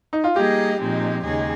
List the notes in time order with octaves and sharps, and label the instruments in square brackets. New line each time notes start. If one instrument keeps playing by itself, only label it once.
[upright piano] D#4
F4
[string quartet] G3 A#3 D#4 G#4 D#5 [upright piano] G4
[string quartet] A#2 F3 G#3 C4 D#4
D#2 C#3 G#3 D#4 G#4